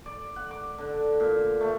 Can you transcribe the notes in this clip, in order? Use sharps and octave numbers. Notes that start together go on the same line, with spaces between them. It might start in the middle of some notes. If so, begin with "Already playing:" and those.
D5
F#5
D6
D3
A#2
A3